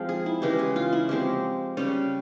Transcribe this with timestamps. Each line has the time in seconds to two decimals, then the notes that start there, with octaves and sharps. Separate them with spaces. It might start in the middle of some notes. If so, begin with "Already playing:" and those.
Already playing: F3 G#3 C4 F4
0.09 G#4
0.26 E4
0.42 C#3 E3 G#3 G4
0.59 G#4
0.76 F4
0.93 E4
1.09 F3 G#3 C4 G4
1.77 C#3 G3 C#4